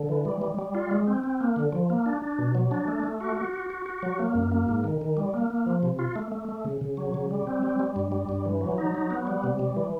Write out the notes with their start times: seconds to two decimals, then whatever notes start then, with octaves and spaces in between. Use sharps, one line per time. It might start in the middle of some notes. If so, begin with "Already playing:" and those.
Already playing: D3
0.09 E3
0.25 G3
0.42 G3
0.59 G3
0.75 F4
0.91 G#3
1.07 C4
1.24 C4
1.40 A#3
1.56 D3
1.73 F3
1.90 A#3
2.06 D4
2.22 D4
2.39 B2
2.55 F#3
2.71 D4
2.88 A3
3.04 A3
3.21 F#4
3.37 F#4
3.53 F#4
3.70 F#4
3.86 F#4
4.03 F#3
4.19 A#3
4.35 F#2
4.52 A#3
4.68 G#2
4.84 D#3
5.01 D#3
5.17 G3
5.34 A#3
5.50 A#3
5.66 F3
5.83 C3
5.99 F4
6.16 A3
6.32 A3
6.49 A3
6.65 C#3
6.81 C#3
6.97 F#3
7.14 C#3
7.31 G3
7.47 C4
7.63 G3
7.79 G3
7.96 G2
8.12 G3
8.29 G2
8.45 E3
8.61 F#3
8.78 D#4
8.95 F#3
9.10 B3
9.27 G3
9.44 C3
9.59 G3
9.77 E3